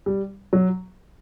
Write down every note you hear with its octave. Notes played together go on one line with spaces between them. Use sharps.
G3
F#3